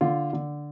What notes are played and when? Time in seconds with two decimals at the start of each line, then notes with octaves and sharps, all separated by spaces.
0.01 D3 F4
0.33 D3